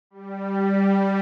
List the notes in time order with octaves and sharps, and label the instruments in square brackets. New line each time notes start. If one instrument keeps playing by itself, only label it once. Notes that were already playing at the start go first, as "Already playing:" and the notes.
[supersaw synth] G3